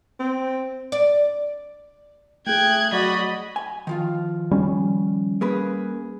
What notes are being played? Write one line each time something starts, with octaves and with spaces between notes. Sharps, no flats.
C4
D5
A3 G#4 G5 F#6 G#6
F#3 F#4 D5 D#5 B5
G#5
D#3 F3 F4
G3 C#4
A#3 G#4 B4